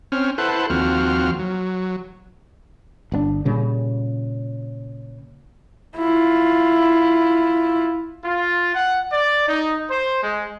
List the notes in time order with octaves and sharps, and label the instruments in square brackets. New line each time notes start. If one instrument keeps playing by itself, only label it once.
[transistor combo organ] C4 C#4 F6
E4 A4 B4 C5 F#5
D#2 F3 C4 F#4 F6
F#3
[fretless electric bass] G1 A#2 D4
A#2 C#3 G3
[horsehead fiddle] E4 F4
[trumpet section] F4
F#5
D5
D#4
C5
G#3